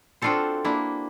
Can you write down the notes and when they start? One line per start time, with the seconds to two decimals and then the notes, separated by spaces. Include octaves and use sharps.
0.22 C4 D4 F4 F#4 A4 C5
0.65 A#3 D4 E4